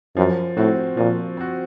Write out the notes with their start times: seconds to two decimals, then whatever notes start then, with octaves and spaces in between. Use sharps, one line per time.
0.16 F#2 F3
0.57 A2 C4 F#4
0.97 A#2 F3
1.37 C4 F#4